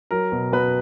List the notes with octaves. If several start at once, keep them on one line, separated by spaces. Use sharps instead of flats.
F#3 A#4
B2
B2 B4